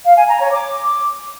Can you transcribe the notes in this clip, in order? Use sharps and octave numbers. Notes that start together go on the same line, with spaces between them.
F5
G#5
A#5
C#5
D6